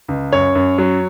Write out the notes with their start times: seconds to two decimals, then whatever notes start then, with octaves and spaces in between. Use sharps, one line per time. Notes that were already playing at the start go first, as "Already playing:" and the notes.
0.08 C#2
0.32 F#2 C#5
0.55 F#2
0.78 F#3